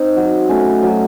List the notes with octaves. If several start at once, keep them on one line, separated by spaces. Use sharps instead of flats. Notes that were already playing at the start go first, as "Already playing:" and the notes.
Already playing: C4 D#4
F#3
A3 C#4
F#3